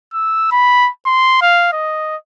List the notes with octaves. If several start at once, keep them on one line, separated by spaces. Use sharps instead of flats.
E6
B5
C6
F5
D#5